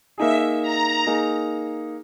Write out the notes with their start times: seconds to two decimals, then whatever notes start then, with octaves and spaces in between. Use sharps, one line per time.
0.18 A#3 D#4 G#4 E5
0.62 A#5
1.06 A#3 D#4 G#4